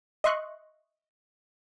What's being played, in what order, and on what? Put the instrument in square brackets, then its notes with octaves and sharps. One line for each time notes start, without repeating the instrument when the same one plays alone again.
[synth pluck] D#5 E5 C6 C#6 F#6